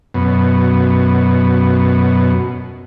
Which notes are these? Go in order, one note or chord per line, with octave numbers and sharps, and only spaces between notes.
F#2 B2